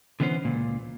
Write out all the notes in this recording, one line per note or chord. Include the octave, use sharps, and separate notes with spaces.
D3 E3 B3 C#4 C5
C#2 A#2